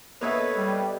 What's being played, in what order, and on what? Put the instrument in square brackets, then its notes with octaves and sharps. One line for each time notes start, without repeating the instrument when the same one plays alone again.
[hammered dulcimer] B2 A4 D#5 [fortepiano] A#3 B3 E5 [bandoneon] B4 C#5
[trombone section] G3